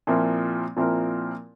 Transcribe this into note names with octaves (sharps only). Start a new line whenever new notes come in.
A#2 F3 C4 E4 A#4
A#2 F3 C4 E4 A#4